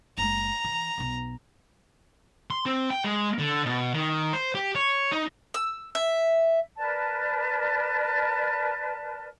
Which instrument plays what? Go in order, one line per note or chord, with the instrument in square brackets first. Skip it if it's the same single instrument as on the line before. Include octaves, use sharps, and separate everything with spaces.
[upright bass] F#1 G#3 [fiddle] A#5
[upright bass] E3
B1 B2
[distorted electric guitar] C6
C4
G5
G#3
D3
B2
D#3
C5
G4
C#5
D#4
[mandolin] E6
E5
[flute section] A#4 B4 D5 A5